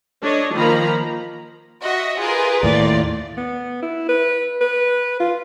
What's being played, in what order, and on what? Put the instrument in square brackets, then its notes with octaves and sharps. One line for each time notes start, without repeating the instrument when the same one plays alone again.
[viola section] D4 A4 C#5 D#5
D#3 F3 A#3 A#5 B5
[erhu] F#4 [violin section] D#5 E5 F#5
[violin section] F4 A#4 B4 [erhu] G#4
[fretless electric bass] D#2 A2 [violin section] F4 [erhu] D5
[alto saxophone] B3
E4
B4
B4
F4